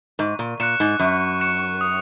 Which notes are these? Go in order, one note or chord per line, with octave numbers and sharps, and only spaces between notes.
G#2 C#6
A#2
A#2 F#6 C#7 E7
G#2
F#2 C#6
F#6 C#7 E7
D#6